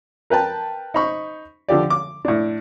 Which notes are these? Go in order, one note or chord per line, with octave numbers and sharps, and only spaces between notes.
A#4 B4 G5 A5
D#4 C5 B5 C#6
D3 F3 G4 D5
D6
A2 D4